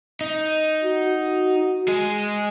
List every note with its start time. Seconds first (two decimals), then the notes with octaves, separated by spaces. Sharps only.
0.21 D#4
0.84 F#4
1.88 G#3 G#4